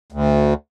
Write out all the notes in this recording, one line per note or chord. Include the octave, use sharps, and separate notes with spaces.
D2